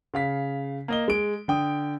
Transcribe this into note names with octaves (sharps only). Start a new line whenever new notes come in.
C#3 F5 B6
A#3 D#5 G7
G#3 D7
D3 G5 D#6